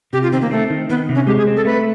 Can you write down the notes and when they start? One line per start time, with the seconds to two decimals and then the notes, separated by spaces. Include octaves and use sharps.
0.13 C3 G4
0.23 F4
0.32 D#3 C4
0.42 A#3
0.51 A3 C4
0.70 D#3
0.90 D#3 B3
1.09 C3
1.15 C#4
1.27 G#3 G4
1.37 G#4
1.47 C4
1.57 A4
1.65 A3 B4